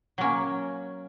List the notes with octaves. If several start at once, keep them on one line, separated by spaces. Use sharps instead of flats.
F#3 A#3 C#4